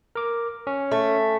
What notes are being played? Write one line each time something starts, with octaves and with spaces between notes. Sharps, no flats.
A#4 D6
C#4
A3